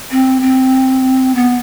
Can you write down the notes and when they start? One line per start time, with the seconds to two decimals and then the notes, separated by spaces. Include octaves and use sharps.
0.11 C4
0.42 C4
1.35 B3